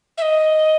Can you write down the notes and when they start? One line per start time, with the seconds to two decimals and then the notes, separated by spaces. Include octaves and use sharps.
0.18 E5
0.22 D#5